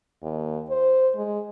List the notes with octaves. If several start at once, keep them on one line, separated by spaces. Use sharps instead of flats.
D#2
C5
G#3